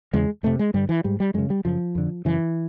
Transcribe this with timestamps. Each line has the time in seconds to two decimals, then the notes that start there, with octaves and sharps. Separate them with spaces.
0.13 E2 C#3 G#3
0.43 F2 C3 A3
0.59 G#3
0.74 G2 D3 G3
0.89 E3
1.04 G#2 G3
1.20 G3
1.34 F#2 C#3 G#3
1.50 G3
1.65 F#2 C#3 F3
1.95 F2 D3
2.25 F#2 C#3 E3